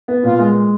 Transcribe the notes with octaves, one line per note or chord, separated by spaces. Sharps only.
B3
A#2 F4
G#3